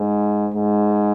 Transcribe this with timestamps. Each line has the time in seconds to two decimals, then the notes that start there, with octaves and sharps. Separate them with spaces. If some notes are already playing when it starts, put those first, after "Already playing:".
Already playing: G#2
0.54 G#2